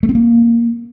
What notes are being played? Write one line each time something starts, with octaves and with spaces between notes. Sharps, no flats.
A3
C4
A#3